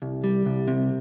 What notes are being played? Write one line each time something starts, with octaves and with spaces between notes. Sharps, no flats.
C2
G3
C2
C3